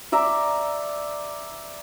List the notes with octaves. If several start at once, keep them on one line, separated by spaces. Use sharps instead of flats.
D5 E5 A#5 D6